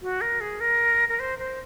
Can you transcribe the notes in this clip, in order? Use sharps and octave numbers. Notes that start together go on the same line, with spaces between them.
F#4
A#4
G#4
A#4
A#4
C5
C5